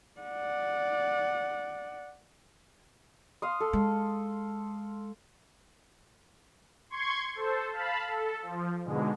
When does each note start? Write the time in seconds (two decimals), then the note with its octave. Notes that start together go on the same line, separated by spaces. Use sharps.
0.20 D5 F#5
3.42 F5 C6 D#6
3.60 A4
3.73 G#3
6.90 C6 C#6 G#6
7.35 A4 C5
7.72 F5 A5 B5
8.08 A4
8.42 F3
8.85 G#2 B2 D3 G#3